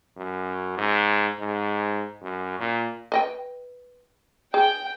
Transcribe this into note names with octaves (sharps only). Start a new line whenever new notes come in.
F#2
G#2
G#2
F#2
A#2
B4 D#5 G5
G#4 G5